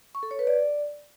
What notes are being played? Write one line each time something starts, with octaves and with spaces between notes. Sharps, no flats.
C#6
A4
C#5
B4
D5